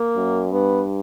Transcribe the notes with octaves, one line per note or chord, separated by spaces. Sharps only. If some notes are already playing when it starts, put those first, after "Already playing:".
Already playing: A#3
F#2
G2 B3